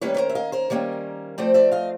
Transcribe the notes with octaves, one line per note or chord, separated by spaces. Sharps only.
D#3 G3 A#3 C#4 B4 C#5
B4
A#4 C5
E5
D#5 F5
A#4 C5
D#3 G3 A#3 C#4
F3 A3 C4 C5 D5
D5 E5
D#5 F5